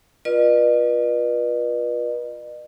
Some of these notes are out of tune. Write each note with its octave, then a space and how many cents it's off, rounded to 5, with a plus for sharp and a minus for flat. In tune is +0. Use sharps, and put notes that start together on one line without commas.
F4 +0 B4 -35 D#5 -45